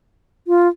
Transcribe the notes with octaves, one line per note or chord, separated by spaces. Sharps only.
F4